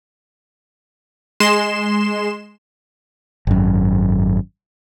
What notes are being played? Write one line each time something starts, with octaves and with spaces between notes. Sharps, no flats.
G#3 C6 E7
G#1 F#2